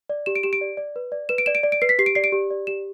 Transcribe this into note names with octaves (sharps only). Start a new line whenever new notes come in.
D5
G4 E7
D7
G4 E7
D7
D5
D5
B4
D5
B4 E7
D7
D5 E7
D7
D5
D7
B4 C7
B6
G4 C7
D7
D5 C7
D7
G4
D5
G4 E7